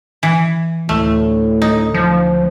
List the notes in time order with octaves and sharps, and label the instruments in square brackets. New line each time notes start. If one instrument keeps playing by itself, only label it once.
[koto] E3
[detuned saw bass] D2 [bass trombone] A2 [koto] A3
[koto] D#4
[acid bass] F3